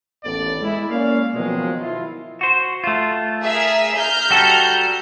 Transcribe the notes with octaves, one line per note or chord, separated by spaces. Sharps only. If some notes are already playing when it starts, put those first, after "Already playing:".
A1 D#2 B3 A4 D5
G#3 E4
A#3 C#4 D5 F5
B2 D#3 F3 F#3 G#3
E4 F4
F#4 C5
A3 F4
G#4 A#4 E5
A#5 F6 G6
G3 F#4 A4